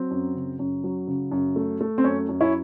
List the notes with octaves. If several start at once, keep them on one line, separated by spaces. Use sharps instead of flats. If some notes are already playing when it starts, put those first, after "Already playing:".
Already playing: F#3 C4
F#2
C#3
F#2
F#3
C#3
F#2
A3
A3
C4
F#2 C#4
F#2
C#4 E4